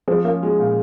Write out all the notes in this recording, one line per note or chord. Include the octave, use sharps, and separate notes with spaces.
F3 G#3 C4
A#3 C#4
G#3
A#2